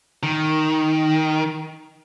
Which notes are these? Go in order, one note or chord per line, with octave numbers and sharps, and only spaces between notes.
D#3